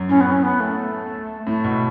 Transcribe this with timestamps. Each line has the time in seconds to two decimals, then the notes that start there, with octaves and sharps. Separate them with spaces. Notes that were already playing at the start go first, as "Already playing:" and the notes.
Already playing: F#2
0.09 A2 C#4
0.21 B3
0.31 C#4
0.43 B3
0.60 A3
1.47 A2 A3
1.64 B2